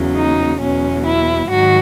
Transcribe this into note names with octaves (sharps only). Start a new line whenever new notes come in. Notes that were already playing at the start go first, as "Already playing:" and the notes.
Already playing: E2 C#3 F#3
D#4
E2 B2 F#3 C#4
E4
G#2 D#3 F#3 F#4